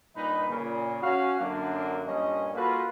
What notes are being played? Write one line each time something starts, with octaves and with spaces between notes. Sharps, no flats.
G2 A#2 G3 D#4 B4 D#5
A#2 C#3
C#4 F#4 F5
F#2 D3 F#3 A#3 D4
G2 A#2 C#4 D#5
A#3 F4 F#4 A4 B4